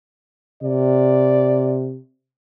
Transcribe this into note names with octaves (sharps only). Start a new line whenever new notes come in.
C3 D5